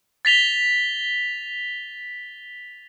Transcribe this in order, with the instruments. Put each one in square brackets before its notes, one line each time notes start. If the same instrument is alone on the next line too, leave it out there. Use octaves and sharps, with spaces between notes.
[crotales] A6 B6 F7 G7